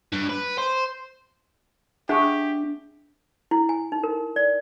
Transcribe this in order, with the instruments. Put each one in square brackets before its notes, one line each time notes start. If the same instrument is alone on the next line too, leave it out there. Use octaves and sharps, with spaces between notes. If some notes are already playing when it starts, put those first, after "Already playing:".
[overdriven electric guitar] G2
B4
C5
[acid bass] D4 [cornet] G4 [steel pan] G#4 F#5 [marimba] E5 C#6
[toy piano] E4
G#5
D#4
A#4
D5